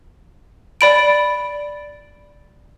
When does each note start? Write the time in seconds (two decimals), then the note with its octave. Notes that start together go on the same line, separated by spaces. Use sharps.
0.81 D5 B5 D7